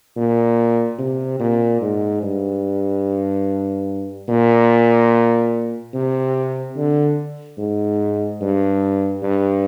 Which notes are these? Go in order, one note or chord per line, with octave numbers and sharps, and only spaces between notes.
A#2
C3
A#2
G#2
G2
A#2
C3
D3
G#2
G2
G2